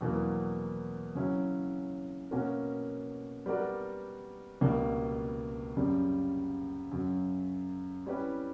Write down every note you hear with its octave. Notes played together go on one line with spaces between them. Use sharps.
E2 B2 F#3 A#3
C#3 F#3 C#4 E4
B2 A#3 C#4 F#4 A#4
G3 B3 F#4 A#4 D5
C#2 B2 G3 A#3
F#2 C#3 G3
F#2 C#3 F#3
G3 C#4 E4 G4 B4